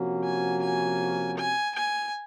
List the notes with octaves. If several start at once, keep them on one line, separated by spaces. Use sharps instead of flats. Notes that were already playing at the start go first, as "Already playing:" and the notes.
Already playing: C3 F3 A#3 C#4 F#4
G#5
G#5
G#5
G#5